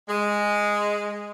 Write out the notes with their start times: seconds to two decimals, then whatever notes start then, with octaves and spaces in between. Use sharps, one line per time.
0.09 G#3